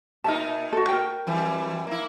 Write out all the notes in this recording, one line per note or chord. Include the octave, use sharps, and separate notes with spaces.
A#2 D#4 A#4 E5 A5
F#4 A4
A#4 G5
F2 E3 G3
A#3 E4